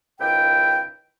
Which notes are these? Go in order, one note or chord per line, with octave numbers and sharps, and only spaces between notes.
C#2 G#2 D#3 E4 G5